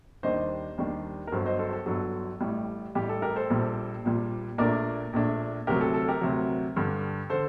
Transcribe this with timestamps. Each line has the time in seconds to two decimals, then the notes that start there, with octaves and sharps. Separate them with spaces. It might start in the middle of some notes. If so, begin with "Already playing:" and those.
0.23 D#2 D#3 G3 D4 C5 D#5
0.78 D#2 D#3 G3 D4
1.27 A#4
1.32 G1 G2 F#3 A4 C5
1.46 C5 D#5
1.59 A4 C5
1.73 A4
1.86 G1 G2 F#3 A4
2.41 A1 A2 G3
2.95 A1 A2 G3 G4
3.09 A4
3.22 G4 A#4
3.36 A4 C5
3.50 A#1 A#2 G3
4.04 A#1 A#2 G3
4.58 A#1 A#2 A3 D4 A#4 D5
5.13 A#1 A#2 A3 D4
5.67 D2 C3 F#3 G4 A#4
5.81 A4
5.94 A4
6.08 G4 A#4
6.21 D2 C3 F#3
6.76 G2 D3 G3
7.30 D3 A4 C5